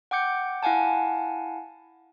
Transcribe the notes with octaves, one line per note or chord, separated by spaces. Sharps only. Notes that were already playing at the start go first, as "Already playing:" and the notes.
F#5 G5 D6 G6 C#7
E4 F5 F#5 G#5 A5